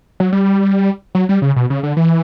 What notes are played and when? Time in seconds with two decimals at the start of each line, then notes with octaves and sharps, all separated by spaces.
0.20 F#3
0.32 G3
1.15 F#3
1.29 G3
1.42 C#3
1.56 B2
1.70 C#3
1.83 D3
1.97 E3